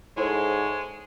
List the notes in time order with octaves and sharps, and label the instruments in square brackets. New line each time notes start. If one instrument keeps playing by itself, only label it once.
[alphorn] G#2 [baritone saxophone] G#3 [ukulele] E4 A4 C5 [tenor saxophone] C#5